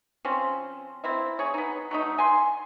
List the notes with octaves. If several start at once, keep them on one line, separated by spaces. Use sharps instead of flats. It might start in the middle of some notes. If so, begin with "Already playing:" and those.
F3 C4 C#4
A#3 C4 E4
G#4 C#5
B3 D#4
F#3 A3 D#4
G#5 C6